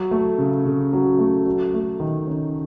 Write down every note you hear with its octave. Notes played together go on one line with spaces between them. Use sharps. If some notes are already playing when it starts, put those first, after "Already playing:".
Already playing: F#3
A3
C#3
C#3
F#3
A3
F#3
A3
D#3
C#4